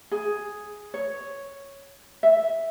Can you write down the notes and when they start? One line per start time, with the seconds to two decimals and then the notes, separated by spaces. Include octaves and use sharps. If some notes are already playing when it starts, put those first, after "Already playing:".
0.11 G#4
0.94 C#5
2.23 E5